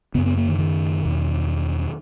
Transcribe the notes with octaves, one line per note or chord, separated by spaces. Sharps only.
F#2 C#3 B3
B3
A#3
D#3
D#3
E2 B2